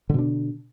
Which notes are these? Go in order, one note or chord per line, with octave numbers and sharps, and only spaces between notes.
B2 D3 D4